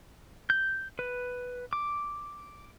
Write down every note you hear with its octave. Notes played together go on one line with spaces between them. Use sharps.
G6
B4
D6